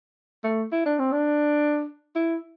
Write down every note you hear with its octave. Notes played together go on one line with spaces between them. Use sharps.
A3
E4
D4
C4
D4
E4